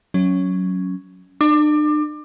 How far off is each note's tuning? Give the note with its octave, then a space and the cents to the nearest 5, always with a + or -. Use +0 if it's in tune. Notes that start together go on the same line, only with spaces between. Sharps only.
F#3 +0 C#4 +0
D4 +45 D6 +25